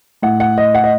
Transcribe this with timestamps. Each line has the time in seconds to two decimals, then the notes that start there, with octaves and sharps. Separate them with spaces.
0.22 A2 F#5
0.40 F#5
0.58 D#5
0.75 F#5
0.84 D#5